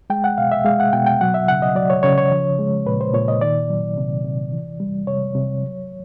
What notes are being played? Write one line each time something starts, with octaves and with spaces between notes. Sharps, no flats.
G#3 G5
F#5
B2 F5
E5
G#3 F5
F#5
B2 G5
G5
F#3 F#5
E5
C#3 F#5
D#5
F#3 D5
C#5
C#3 C#5
C#5
F3
G#3
A#2 B4
C5
A#2 C#5
D#5
D#3 D5
F#3
C3
C3
E3
G3
C3 C#5
C3
F#3